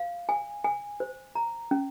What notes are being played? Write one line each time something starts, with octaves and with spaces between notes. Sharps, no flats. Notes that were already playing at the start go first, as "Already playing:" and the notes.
Already playing: F5
G#5
G#5
C5
A#5
C#4